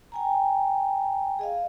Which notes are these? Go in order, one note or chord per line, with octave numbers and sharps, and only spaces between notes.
G5 G#5 A#5
G#4 D#5 F5